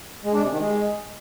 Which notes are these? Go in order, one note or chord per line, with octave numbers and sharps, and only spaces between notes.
G#3
D4
C3
D#3
G#3